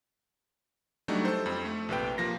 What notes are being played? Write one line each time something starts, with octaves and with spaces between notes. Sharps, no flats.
F#3 G3 A3 D4 D#4
A4 C5
F2 C4
A3
A#1 C3 B4 G5
F3 A#3 A#6